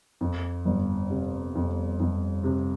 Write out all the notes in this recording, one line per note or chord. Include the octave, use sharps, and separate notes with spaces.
F2
G1
C3
F2
F2
C3